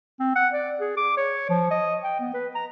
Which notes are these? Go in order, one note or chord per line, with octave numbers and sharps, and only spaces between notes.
C4
F#5
D5
G#4
D6
C#5
F3
D#5
G5
B3
B4
A#5